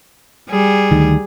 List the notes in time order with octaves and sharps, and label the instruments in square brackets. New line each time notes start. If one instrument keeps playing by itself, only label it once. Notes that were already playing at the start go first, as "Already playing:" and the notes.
[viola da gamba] G3 G#4
[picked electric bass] D2 D#3